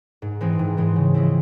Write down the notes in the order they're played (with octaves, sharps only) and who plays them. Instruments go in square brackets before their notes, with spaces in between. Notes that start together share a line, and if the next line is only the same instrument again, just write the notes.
[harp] G#2
E3 G#3 C4
G#2
E3 G#3 C4
C#3
F3 G#3 C4 E4